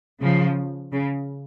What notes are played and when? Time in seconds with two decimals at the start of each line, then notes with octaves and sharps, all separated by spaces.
0.21 C#3 F3
0.93 C#3